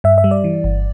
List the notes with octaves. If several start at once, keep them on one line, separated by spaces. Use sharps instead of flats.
G2 E5
E5
G3
D5
E3
G1